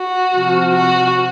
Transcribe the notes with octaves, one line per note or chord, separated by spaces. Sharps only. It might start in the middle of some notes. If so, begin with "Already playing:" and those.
Already playing: F#4
C3 F3
F#4